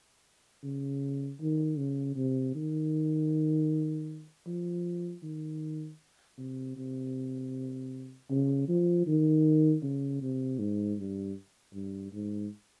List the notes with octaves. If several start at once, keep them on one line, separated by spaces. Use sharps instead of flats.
C#3
D#3
C#3
C3
D#3
F3
D#3
C3
C3
C#3
F3
D#3
C#3
C3
G#2
G2
G2
G#2